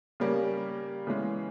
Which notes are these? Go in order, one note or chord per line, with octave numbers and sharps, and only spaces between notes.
C#3 G3 A#3
C#3 E3 G#3